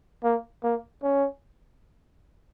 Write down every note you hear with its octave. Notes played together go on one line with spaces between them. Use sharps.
A#3
A#3
C#4